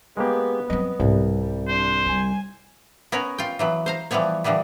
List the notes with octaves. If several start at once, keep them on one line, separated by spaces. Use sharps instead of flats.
G#3 A#3 B3 G4
F#3 B3 C4 D#5
C2 G#2
G3
D4 C5
G3 G#5
B3 C#4 A#4 C#5
F4 G5
E3 F#3 B3
C5 F5 A#5
E3 F3 G3 B3 C#5
A#2 D3 E3 G3 B3